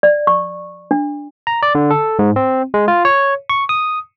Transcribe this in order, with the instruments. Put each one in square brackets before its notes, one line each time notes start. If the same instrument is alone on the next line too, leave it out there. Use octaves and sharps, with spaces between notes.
[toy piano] D5
C#6
D4
[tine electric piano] A#5
D5
D3
A4
G#2
C4
G#3
F4
C#5
C#6
D#6